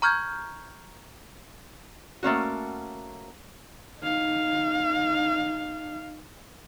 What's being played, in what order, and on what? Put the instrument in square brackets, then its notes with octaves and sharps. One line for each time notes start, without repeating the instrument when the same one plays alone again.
[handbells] A#5 C#6 F6 G6 G#6
[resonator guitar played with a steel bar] A3 A#3 C#4 F#4
[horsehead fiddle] D#4 F5